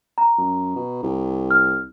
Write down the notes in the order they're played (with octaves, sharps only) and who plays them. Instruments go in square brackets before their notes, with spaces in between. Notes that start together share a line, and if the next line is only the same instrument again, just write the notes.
[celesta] A#5
[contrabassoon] F#2
B2
C2
[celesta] F6